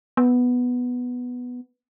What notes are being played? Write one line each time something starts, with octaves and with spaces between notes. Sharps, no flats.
B3